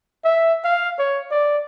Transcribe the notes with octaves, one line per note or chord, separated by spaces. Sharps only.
E5
F5
C#5
D5